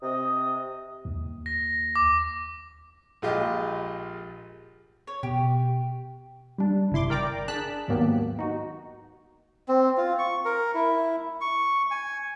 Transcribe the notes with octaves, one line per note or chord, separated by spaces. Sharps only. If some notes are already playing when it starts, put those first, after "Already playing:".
C3 D#5
D#2
A#6
D6
A#1 G#3 F4 G4 D#5
C#5
B2 G4
G3 D4
G1 C2 E4 C6 D6
A#4 D5 G5 A#5 D6
D4 G#4 A5 F#6 B6
D#2 G#2 F#3 A#3 B3 G4
D#4 F#4
C4
F4
C#6
A#4
E4
C#6
G#5